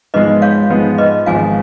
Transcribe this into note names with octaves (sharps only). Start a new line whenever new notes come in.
G#2 F3 G#3 B3 B4 D#5
C#5 F5
G#2 F3 G#3 B3
B4 D#5
G#1 G#2 F3 F5 G#5